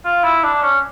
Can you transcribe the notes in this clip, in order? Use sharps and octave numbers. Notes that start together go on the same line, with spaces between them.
F4
E4
D4
C#4